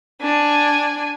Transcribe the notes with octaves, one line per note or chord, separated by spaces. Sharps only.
D4 G#5